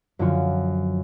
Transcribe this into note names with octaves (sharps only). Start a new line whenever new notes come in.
F#2 D3 F3 F4 F#4